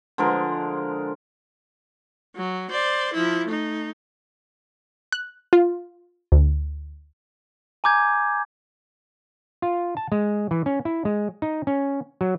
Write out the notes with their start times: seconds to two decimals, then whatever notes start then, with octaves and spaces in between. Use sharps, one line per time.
0.18 D3 F3 G#3 A#4
2.36 F#3
2.71 C5 D5
3.13 F3 E4
3.47 A3 D#4
5.12 F#6
5.53 F4
6.32 D2
7.84 G#5 A#5 D6 G6 G#6
9.62 F4
9.97 A5
10.12 G#3
10.51 E3
10.66 C#4
10.85 E4
11.05 G#3
11.42 D#4
11.67 C#4
12.21 F#3